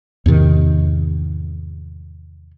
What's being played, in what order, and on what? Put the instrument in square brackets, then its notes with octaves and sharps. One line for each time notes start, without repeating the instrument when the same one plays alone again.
[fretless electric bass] E2 G#2 C3 D#3